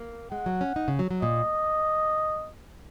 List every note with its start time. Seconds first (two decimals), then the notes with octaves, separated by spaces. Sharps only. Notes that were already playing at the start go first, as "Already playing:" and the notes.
Already playing: A#3
0.32 G#3 F#5
0.46 F#3
0.61 C#4
0.76 D#4
0.88 C#3
0.99 F#3
1.11 F#3
1.22 A#2 D#5